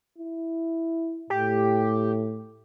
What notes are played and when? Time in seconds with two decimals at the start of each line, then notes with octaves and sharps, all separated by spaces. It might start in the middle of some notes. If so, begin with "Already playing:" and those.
0.18 E4
1.30 A2 G4